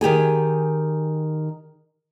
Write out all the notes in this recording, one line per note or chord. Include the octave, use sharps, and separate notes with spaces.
D#3 G4 G#4 G#5